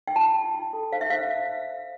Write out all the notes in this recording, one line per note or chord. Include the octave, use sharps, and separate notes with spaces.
G5
F4 A5
F4
F4
A4
C5 F5
E5
C5 F5